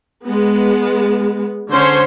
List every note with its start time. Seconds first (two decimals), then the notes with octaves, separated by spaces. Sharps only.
0.25 G#3 B3
1.72 D3 C#4 C5 C#5 C6